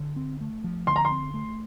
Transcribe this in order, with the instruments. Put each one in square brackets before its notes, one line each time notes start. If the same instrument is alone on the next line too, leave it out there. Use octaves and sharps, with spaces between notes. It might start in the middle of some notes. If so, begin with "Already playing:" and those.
Already playing: [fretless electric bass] D3
C4
A3
F3
[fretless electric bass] D3 [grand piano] C6
[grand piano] A#5
C6
[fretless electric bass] C4
A3